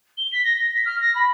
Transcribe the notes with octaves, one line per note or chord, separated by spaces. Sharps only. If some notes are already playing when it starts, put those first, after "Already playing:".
G7
B6
A#6
A#6
B6
F6
A#6
B5